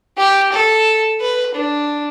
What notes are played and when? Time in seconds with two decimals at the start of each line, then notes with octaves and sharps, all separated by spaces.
0.17 G4
0.52 A4
1.20 B4
1.54 D4